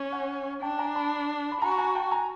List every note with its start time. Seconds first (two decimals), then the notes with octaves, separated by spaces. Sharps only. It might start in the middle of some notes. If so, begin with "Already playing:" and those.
Already playing: C#4
0.12 F#5 G#5
0.62 D4 G5 A5
0.78 G#5 A#5
0.95 A5 B5
1.52 B5
1.61 F#4 G#5 A#5
1.71 B5
1.78 G#5 A#5
1.95 G5 A5
2.11 G#5 A#5